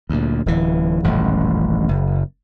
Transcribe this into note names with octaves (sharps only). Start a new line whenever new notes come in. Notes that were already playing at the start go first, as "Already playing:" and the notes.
D2 A#2
D1 E3
D#1 A1 F#2
F#1